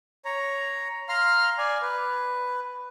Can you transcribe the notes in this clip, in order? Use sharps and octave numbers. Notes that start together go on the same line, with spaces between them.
C#5 A#5
F5 A#5 C6 F6
D5 G#5
B4